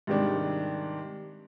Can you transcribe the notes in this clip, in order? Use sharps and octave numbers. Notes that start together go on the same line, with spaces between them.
G#2 C3 D#3 G3 D4